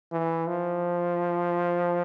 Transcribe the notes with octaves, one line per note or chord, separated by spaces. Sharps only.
E3
F3